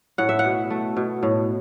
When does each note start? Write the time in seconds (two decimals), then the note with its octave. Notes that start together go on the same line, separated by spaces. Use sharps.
0.18 A2 F#5
0.29 E5
0.39 F#5
0.44 B2
0.70 A3
0.97 B2
1.23 A2